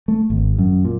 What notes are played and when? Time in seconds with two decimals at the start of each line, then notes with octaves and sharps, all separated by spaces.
0.08 A3
0.30 G#1
0.58 F#2
0.85 A#2